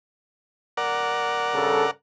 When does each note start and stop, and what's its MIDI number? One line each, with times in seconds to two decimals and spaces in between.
0.77 1.91 70
0.77 1.91 74
0.77 1.91 78
1.54 1.84 43
1.54 1.84 49
1.54 1.84 69